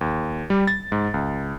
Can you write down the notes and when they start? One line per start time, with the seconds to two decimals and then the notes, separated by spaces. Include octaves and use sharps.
0.01 D#2
0.50 G3
0.67 A6
0.92 G#2
1.14 C#2